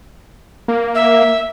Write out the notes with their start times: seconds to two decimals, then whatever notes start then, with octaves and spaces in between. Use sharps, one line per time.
0.68 A#3
0.94 E5